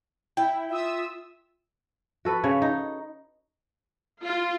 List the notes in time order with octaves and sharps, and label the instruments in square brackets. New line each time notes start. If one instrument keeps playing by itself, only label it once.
[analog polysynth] E4 [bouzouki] G5
[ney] F4 [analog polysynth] E5 D#6 E6
[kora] F#4 A4 B4
C#3 C#5
D#4
[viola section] F4